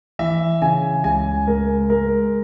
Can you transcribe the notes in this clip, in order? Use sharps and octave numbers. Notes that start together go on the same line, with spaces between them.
E3 E5
C#3 G#5
C#2 G#5
G#3 A#4
G#3 A#4